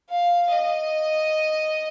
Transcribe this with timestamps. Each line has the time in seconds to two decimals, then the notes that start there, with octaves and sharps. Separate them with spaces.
0.10 F5
0.52 D#5